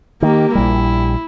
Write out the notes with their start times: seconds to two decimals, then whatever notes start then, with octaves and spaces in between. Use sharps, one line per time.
0.22 D#3 A#3 G4
0.55 A#1 G3 E4